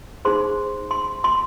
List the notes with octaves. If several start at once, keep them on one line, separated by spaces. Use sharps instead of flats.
D#4 G#4 C5 C6
C6
C6